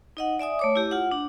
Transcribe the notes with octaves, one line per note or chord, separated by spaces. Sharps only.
D#4 D#5 F#5
D5 E5 G#5 D#6
A3 C#5 D6
E4 G4
F4 F#5
D4